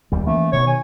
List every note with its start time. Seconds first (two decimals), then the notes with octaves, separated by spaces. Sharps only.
0.12 D#2 G3
0.27 E3 A3 A#3 C#4
0.52 B2 D#3 C#5
0.67 G#5